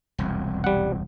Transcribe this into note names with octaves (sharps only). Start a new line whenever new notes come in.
E1 C2 F2
G3 F#5